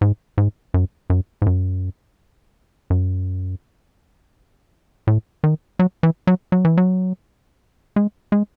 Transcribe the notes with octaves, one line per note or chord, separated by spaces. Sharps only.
G#2
G#2
F#2
F#2
G#2
F#2
F#2
A2
D#3
F#3
E3
F#3
F#3
E3
F#3
G#3
G#3